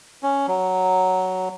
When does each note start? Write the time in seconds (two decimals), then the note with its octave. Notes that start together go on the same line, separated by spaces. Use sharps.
0.23 C#4
0.48 F#3